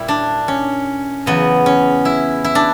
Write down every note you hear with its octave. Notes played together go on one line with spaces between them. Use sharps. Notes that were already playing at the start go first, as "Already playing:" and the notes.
Already playing: A#2 G3 E4
D4
C#4
E2 C#3 F#3 B3
C#4
E4
E4
D4